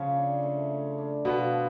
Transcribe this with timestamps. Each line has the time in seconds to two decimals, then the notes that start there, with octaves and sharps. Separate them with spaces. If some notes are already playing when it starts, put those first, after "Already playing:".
Already playing: C#3 F3 C#4
0.16 D4
0.43 A3
0.71 A3
0.98 D4
1.25 B2 F3 B3
1.52 F3